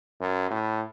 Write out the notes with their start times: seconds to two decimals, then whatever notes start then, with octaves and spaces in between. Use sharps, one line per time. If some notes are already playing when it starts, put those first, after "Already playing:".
0.21 F#2
0.51 A2